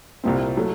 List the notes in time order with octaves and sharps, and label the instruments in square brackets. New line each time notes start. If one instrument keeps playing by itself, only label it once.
[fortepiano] C2 A#2 G3 C4
F#3 A3